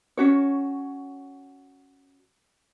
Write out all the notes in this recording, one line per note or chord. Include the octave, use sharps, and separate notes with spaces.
C#4 F#4 C#5